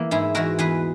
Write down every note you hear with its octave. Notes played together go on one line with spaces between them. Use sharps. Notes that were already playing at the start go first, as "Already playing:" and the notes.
Already playing: E3 A#3
G#2 E4 G#4
E3 G#3 F#4 A#4
E2 G#4 B4